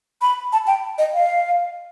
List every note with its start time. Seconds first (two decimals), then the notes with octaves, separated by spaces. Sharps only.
0.22 B5
0.53 A5
0.67 G5
0.98 D#5
1.14 F5